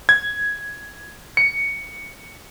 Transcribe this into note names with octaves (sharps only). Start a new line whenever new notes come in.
G#6
C#7